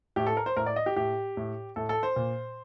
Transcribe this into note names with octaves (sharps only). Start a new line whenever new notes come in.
A2 G4
A4
A#4
C5
A2 A#4
D5
D#5
G4
A2 G4
A2
A2 A4
A4
C5
A#2